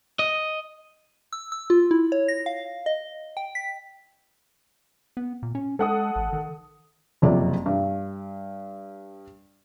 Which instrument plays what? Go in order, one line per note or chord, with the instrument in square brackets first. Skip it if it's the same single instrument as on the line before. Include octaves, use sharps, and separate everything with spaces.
[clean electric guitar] D#5
[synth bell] E6
E6
F4
E4
C#5
A#6
F5
D#5
G5
B6
[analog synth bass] B3
A#2
C#4
[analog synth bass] G#3 [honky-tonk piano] A4 F#5 D#6
[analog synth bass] A1
D#3
[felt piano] F#1 F2 C3 D5
G2